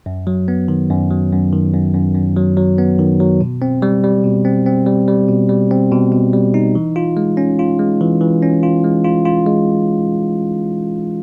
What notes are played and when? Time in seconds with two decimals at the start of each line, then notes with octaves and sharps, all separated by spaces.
0.06 F#2
0.27 F#3
0.48 B3
0.68 D#3
0.90 F#2
1.11 F#3
1.32 F#2
1.53 D#3
1.73 F#2
1.94 F#2
2.15 F#2
2.37 F#3
2.57 F#3
2.78 B3
2.99 D#3
3.20 F#3
3.41 B2
3.62 C4
3.82 G3
4.04 G3
4.24 B2
4.45 C4
4.66 C4
4.87 G3
5.08 G3
5.29 B2
5.49 G3
5.71 C4
5.91 B2
6.12 B2
6.33 G3
6.54 D#4
6.75 E3
6.96 F4
7.17 G#3
7.37 C#4
7.59 F4
7.79 G#3
8.01 E3
8.21 E3
8.43 C#4
8.63 F4
8.84 G#3
9.05 F4
9.25 F4
9.46 G#3